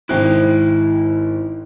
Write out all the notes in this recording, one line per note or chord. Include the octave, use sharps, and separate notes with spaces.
G#1 E4 C5 G5 F#6